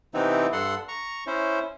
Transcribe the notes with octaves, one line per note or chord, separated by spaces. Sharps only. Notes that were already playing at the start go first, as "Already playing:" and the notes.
C3 E3 B3 C4 D#4 E4
G2 A4 F#5 C6
A#5 C#6
C#4 E4 C5